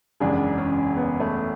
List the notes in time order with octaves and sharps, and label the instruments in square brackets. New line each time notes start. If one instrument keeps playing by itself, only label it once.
[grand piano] F#1 E2 C#3 G#3 [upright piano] D4
[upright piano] C#4
B3
A3